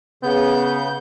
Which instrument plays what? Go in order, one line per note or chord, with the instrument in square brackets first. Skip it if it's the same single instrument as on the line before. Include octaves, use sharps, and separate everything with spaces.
[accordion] C#3 G6 [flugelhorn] B3